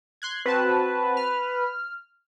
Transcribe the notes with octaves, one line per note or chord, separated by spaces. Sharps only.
C6 F#6 G#6
C4 F#4 B4 A5
F6